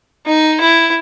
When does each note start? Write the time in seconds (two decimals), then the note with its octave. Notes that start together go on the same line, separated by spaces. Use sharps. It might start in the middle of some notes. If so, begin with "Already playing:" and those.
0.26 D#4
0.61 E4